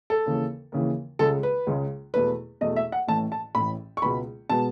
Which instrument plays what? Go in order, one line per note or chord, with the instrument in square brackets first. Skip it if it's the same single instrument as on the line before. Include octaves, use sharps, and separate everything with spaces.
[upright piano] A4
D#2 C#3 E3
D#2 C#3 E3
C#2 C#3 G#3 A4
B4
C#2 C#3 G#3
E2 B2 A3 B4
E2 B2 A3 D#5
E5
F#5
A1 A2 E3 A5
A5
A1 A2 E3 B5
C#6
C#2 B2 G#3 B3 B5
B2 G#3 B3 A5